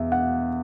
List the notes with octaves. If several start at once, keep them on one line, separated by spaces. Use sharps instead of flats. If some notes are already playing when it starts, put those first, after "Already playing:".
Already playing: E2 B2 B3 E5
F#5